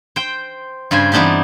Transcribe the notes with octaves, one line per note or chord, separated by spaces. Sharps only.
C5 G5
G2 C#3 C5 G#5
E3 B3 C4 D4 D#4 G4